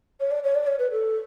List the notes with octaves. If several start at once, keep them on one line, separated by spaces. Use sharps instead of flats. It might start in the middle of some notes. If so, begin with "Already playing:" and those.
C#5
D5
C#5
D5
C#5
B4
A4